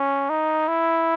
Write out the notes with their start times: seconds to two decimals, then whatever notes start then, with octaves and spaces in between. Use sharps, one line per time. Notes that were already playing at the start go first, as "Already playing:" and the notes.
Already playing: C#4
0.30 D#4
0.68 E4